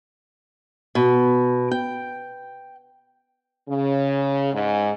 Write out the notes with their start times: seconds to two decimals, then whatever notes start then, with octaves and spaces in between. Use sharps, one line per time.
0.95 B2
1.71 G5
3.69 C#3
4.53 G#2